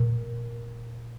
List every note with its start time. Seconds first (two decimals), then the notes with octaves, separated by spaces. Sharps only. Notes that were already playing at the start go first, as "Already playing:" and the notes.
Already playing: A#2